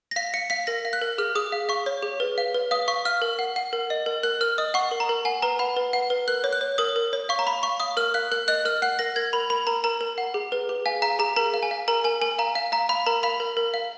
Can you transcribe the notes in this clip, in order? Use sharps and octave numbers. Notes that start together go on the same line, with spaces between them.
A#6
F5 B6
F5 C#7
F5 B6
A#4 A#6
F5
F#6
A#4
G#4 F6
G#4 D#6
F5
F5 C#6
C#5
G#4
B4
F5
B4
F5 D#6
F5 C#6
F5 F6
A#4
F#5
F#5
A#4
D#5
A#4
A#4 F#6
A#4 F6
D#5 D#6
F#5 C#6
A#4
A#5
A#4
F#5 G#5
B4 A#5
F#5 B5
B4
F#5
B4
A#4 F#6
C#5
F#6
C#5
A#4 D#6
A#4
C#5
F5 C#6
A#5
F5 B5
F5 C#6
F5 D#6
A#4 F6
F5 F#6
A#4 F#6
D#5 F#6
A#4 F6
F#5 F#6
A#4 A#6
A#4 G#6
A#4 B5
A#4 B5
A#4 A#5
A#4 A#5
A#4
F#5
G#4
B4
G#4
F5 G#5
F5 A#5
G#4 A#5
A#4 A#5
F5
G#5
F5
A#4 A#5
A#4 G#5
A#4 G#5
F5 A#5
F5
F5 A#5
F5 B5
A#4 A#5
F5 B5
A#4
A#4
F5